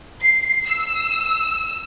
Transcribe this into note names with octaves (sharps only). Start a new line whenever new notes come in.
C7
E6